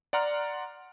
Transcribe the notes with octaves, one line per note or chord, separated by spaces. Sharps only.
D5 F#5 A#5 C6 F6